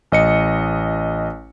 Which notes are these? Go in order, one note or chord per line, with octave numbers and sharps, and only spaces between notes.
A1 D#5 C#7